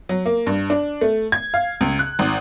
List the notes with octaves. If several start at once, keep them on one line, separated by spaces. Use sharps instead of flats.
F#3
A#3
G2
D4
A3
G#6
F5
C#2
F#6
G#1